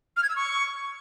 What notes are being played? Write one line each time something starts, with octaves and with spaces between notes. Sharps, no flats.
F6
G#6
E6
C#6